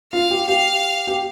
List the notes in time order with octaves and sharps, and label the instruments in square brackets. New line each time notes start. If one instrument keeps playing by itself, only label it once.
[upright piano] F4 [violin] F5
[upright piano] G4
[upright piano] G4 [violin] F5
[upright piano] G4